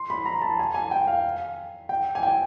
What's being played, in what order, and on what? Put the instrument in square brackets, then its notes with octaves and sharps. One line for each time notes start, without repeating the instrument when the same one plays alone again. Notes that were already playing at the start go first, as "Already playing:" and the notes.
Already playing: [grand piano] C6
B5
A#5
A5
G#5
G#5
G5
F5
G5
G#5
G5